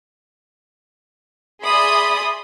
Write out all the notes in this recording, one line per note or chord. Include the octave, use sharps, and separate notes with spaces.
G#4 D5 E5 B5 C6 D#6